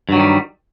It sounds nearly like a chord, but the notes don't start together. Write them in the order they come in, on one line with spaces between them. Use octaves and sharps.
G2 F#3 D#3 G3